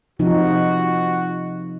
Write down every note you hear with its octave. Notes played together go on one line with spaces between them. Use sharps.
C3 F3 D#4 F#4